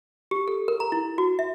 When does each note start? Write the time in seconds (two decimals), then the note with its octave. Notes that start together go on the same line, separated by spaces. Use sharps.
0.31 G4
0.48 A4
0.68 A#4
0.80 A#5
0.92 E4
1.18 F#4
1.39 E5